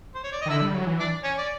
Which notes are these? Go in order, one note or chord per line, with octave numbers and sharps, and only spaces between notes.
C5
C#5
D5
D#5
D#3
D3 E4 E5
G3
F#3
E3
D4 D5
C#4 C#5
D5